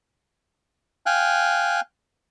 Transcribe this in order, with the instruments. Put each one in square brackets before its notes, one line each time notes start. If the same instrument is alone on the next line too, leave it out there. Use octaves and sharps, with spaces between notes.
[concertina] F5 G5 G#5 F#6